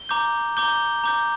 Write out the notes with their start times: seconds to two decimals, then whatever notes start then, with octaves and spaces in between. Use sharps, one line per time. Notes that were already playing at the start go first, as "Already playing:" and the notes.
Already playing: G7
0.09 A#5 D6 G6
0.57 A#5 D6 G6 G7
1.04 A#5 D6 G6